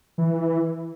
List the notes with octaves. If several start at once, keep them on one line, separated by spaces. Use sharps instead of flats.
E3